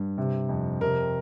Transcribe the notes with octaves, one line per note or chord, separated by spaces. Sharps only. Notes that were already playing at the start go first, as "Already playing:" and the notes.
Already playing: G2
C3
F2
C3 A#4